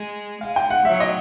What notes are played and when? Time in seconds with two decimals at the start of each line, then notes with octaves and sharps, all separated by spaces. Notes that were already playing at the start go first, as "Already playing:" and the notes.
Already playing: G#3
0.41 G#3 F5
0.56 G5
0.70 F#5
0.85 F#3 E5
1.00 D#5